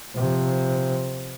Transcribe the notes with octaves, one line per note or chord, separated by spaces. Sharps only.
C3 F3